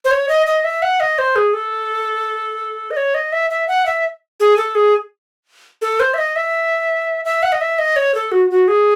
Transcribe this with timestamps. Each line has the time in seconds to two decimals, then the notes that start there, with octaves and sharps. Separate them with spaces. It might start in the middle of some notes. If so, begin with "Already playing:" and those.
0.05 C5
0.11 C#5
0.29 D#5
0.47 D#5
0.64 E5
0.82 F#5
1.00 D#5
1.18 C5
1.36 G#4
1.54 A4
2.91 D#5
2.97 C#5
3.15 D#5
3.32 E5
3.50 E5
3.68 F#5
3.86 E5
4.40 G#4
4.57 A4
4.75 G#4
5.82 A4
6.00 C5
6.14 E5
6.18 D#5
6.36 E5
7.25 E5
7.43 F#5
7.52 D#5
7.61 E5
7.79 D#5
7.96 C#5
8.15 A4
8.32 F#4
8.50 F#4
8.68 G#4